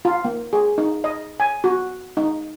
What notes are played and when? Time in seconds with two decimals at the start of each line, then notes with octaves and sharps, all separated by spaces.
0.05 F4
0.25 A#3
0.53 G#4
0.78 D#4
1.04 D#5
1.40 G#5
1.64 F#4
2.17 D#4